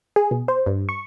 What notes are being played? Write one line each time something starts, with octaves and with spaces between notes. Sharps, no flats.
G#4
B2
C5
G2
C#6